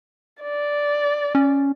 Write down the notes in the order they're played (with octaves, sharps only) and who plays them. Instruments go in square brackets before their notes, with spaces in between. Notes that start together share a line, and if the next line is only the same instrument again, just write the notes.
[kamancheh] D5
[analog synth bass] C#4